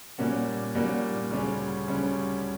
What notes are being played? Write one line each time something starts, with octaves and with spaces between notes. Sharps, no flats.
A#2 G3 A#3 C#4 F#4
A#2 G3 A#3 C#4 F#4
D2 C#3 G3 C#4
D2 C#3 G3 C#4